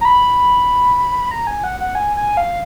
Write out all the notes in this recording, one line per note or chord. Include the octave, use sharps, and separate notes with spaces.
A#5
B5
A#5
G#5
F#5
F#5
G#5
G#5
F5